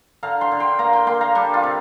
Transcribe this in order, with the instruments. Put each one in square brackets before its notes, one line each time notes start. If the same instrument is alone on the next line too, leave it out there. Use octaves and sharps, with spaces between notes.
[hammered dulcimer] D3 F5 A#5
G5 C6
D3
G5 C6
A#3 F5 A#5
G5 C6
A#3 G5 C6
F5 A#5
G3 D4 G4
F4
C3